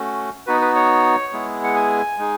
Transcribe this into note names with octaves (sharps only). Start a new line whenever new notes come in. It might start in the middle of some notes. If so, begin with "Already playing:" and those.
Already playing: A3 C#4 F#4
B3 D#4 F#4 B4
B4
C#5
G#3 B3 E4 G#4
F#5
G#5
G#3 D#4 G#4